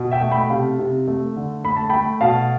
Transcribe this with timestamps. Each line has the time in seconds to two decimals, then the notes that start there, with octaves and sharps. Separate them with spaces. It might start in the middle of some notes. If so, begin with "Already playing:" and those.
Already playing: B2
0.11 E5 G5
0.21 A3
0.31 G5 B5
0.49 C3 F5 A5
0.79 C3
1.07 A3
1.36 D3
1.64 A3 B5
1.77 A5
1.90 A3 G5 B5
2.21 B2 F5 A5